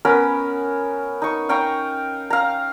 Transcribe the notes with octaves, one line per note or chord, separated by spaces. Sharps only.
B3 C#4 A#4 B5
D#4 C#6
F5 G5 A#5 C#6
F5 A#5